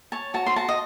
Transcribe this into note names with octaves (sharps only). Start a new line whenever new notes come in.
C#5 A5
F#4 A5
C6
F#4 A5
D#5